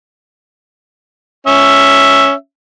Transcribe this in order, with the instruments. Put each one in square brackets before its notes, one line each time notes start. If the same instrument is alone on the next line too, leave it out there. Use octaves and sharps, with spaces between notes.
[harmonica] C#4 E5